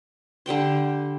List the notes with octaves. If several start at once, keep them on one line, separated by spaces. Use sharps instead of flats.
D3 G3 G5 C6